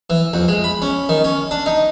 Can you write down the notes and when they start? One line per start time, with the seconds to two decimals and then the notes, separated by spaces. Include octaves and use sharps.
0.10 E3
0.34 F2
0.48 G#3
0.64 B5
0.82 C#4
1.09 D#3
1.24 C#4
1.51 D4
1.66 D#4